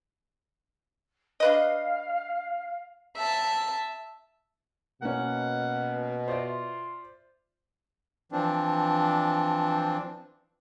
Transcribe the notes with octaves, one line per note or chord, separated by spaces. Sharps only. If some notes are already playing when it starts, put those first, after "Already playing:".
D4 B4 D#5 F5
E5 A5
B2 A#3 C#4 F#5
F4 C5 D5 E5
E3 F3 C4 D4